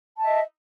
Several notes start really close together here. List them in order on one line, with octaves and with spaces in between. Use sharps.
A5 E5 D#5